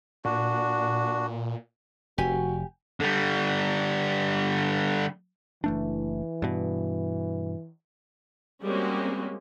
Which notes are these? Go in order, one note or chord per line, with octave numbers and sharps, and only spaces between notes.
A#2 D4 F#4
F1 F#4 G4 G#5
D3 G3
F#1 E3 A3 D4
G2 B2
G3 G#3 A#3 C4 C#4 F#4